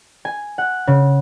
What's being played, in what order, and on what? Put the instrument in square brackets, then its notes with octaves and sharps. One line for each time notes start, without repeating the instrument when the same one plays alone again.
[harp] G#5
F#5
C#3